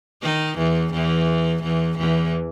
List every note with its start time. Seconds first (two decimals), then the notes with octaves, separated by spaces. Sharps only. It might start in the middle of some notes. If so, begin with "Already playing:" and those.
0.23 D#3 D#4
0.58 E2 E3
0.93 E2 E3
1.63 E2 E3
1.98 E2 E3